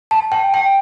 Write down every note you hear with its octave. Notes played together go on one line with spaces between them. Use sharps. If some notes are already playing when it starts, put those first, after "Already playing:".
A5
G5
G5